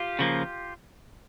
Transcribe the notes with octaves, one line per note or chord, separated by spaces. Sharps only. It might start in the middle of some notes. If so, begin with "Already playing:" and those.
Already playing: F4 G4
C#3 F3 A#3